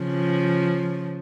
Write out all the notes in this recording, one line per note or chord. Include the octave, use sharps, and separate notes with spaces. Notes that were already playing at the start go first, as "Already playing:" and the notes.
Already playing: C#3 F3